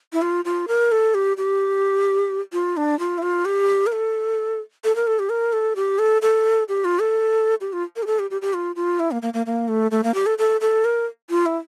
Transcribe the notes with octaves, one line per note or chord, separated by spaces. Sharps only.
E4
F4
F4
A#4
A4
G4
G4
F4
D4
F4
E4
F4
G4
A#4
A4
A4
A#4
A4
G4
A#4
A4
G4
A4
A4
G4
F4
A4
G4
F4
A#4
G4
A4
G4
G4
G4
F4
F4
E4
A#3
A#3
A#3
A#3
A3
A3
A#3
G4
A4
A4
A4
A#4
F4
E4